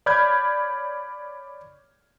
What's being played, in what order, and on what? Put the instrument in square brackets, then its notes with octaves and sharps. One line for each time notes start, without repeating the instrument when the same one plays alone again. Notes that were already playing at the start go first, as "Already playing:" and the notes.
[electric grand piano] C#5 D5 B5 F6 G6 G#6